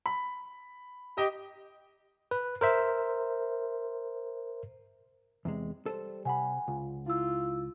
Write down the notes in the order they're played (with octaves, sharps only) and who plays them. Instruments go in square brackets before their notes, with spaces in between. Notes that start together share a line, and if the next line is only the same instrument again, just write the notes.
[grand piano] B5
[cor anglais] G4 [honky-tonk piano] D#5
[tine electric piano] B4
A#4 C5 E5
[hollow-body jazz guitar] E2 C3 G#3
[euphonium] G3 [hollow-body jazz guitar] A4 B4 C5
[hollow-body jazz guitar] C3 B5 [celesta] F#5 G#5
[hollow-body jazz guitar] C#2 [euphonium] F4
[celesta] E4 E6 [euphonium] F4